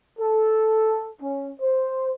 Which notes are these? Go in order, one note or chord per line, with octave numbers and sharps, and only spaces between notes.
A4
C#4
C5